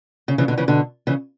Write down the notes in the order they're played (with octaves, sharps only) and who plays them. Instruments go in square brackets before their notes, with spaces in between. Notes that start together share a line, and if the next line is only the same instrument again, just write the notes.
[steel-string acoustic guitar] C#3
C#3 E3
B2 D3
C#3 E3
B2 D3
C#3 E3